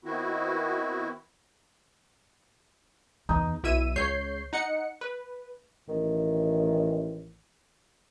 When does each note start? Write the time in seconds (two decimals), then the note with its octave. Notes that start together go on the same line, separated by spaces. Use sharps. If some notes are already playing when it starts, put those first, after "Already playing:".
0.04 D#3 B3 C4 E4 F#4
3.29 E2 D#4
3.64 B1 E4 E5 E6 D#7
3.96 C#2 C#5 G6 C7
4.53 D#4 F#5 C#7
5.01 B4
5.88 A1 D#3